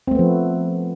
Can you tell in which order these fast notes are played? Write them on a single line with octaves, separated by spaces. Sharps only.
C4 A3 B3 F3